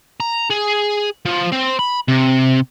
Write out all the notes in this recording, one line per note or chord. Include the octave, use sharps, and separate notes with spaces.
A#5
G#4
F3
C4
B5
C3